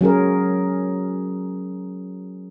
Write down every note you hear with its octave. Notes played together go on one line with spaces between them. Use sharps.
F#3 C#4 G#4 A#4